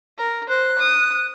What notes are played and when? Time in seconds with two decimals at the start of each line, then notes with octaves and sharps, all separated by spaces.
0.18 A#4
0.49 C5 F#6
0.78 D#6